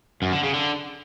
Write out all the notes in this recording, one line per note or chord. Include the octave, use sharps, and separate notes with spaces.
F#2
D3
C#3
D3